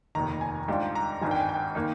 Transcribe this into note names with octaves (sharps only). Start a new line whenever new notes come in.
F1 D#2 D#3 A#5
G#5
G#2 G3 D4 F4 G5
A#5
G#1 G2 D#3 G3 G#5
G5
G#5
G5
D#3 A#3 D#4